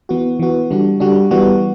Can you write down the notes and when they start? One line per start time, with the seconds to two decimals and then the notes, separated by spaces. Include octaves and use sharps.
0.09 E3 B3 F#4
0.39 E3 B3 F#4
0.70 D3 G3 D4 F#4
1.00 D3 G3 D4 F#4
1.31 E3 G3 B3 F#4